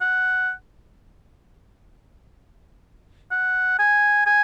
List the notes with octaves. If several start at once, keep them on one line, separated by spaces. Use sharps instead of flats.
F#5
F#5
G#5
G#5